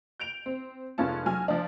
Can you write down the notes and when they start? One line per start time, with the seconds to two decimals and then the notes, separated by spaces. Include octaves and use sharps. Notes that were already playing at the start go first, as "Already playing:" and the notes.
0.20 G6 D7 F7
0.46 C4
0.98 F1 G#3 B3 C#4 F4 A5
1.26 F#3 G#5 F6
1.48 F3 D4